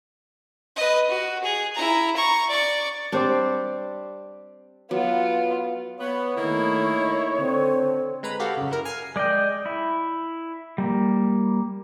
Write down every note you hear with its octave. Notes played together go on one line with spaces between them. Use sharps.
B4 D#5
F#4
G#4
E4 A#5
A#5 C#6
D5 C#6
G3 C4 D4 C5 D5
F#3 B3 F4
B3 C#5
D#3 A3 A#3 D#4 E4
D3 C4
G#3 B4 A#5 B5
F#4 G4 A4 F5 F#5
F#2 C#3
E4 A#4
G#5 F6 C7
G#3 D5 D#5 G5
E4
G3 A#3